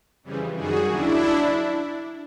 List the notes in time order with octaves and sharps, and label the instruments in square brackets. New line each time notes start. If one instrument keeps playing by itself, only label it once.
[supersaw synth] F2 C#3 E3 G3
F#2 D#3 G3 F#4 G#4
D#2 C#3 F#3 D4 E4